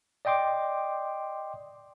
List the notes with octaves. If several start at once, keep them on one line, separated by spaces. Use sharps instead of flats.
D5 D#5 G5 C6 D6